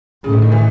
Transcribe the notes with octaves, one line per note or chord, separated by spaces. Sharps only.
A2 C#3
D3
D#3
E3